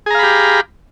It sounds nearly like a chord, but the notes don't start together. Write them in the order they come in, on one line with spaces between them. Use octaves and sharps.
G#4 A#5 F5 B5 G4